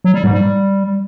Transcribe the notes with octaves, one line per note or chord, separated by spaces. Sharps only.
F#3
G3
G#2
G3